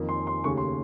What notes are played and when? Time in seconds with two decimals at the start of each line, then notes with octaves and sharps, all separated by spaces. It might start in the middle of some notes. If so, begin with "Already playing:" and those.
Already playing: F2 D#3 A#3
0.09 C6
0.27 C6
0.44 D#2 C#3 A3 C#6
0.57 C6